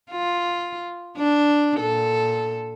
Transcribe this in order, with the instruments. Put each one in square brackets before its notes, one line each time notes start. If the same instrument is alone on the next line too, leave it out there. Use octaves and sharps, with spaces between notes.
[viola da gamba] F4
D4
A#2 A4